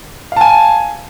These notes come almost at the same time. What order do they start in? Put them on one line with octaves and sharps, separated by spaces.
F5 A5 G#5